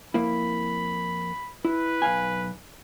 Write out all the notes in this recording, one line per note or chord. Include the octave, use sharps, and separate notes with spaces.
F2 A#3 E4 B5
E4 B4
B1 F5 G#5